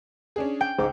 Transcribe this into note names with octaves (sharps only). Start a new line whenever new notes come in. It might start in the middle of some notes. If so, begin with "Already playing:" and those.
C#4 D4 G#4
G5
C#2 G#2 D6